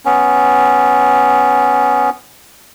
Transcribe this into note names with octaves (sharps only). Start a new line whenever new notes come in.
B3 C#4